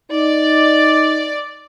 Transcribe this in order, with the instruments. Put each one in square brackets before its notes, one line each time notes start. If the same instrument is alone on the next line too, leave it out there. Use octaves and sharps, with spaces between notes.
[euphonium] D#4 [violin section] D5